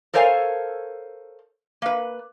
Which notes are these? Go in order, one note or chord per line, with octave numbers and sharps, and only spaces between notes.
A4 A#4 C5 C#5 F5 G#5
A#3 B4